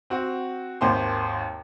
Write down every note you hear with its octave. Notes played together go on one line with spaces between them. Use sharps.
C4 F#4
G#1 D#2 C5 C6